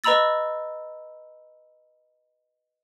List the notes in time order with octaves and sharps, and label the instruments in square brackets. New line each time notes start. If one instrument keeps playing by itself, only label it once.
[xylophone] B4 D#5 A#5 B5 E6 A6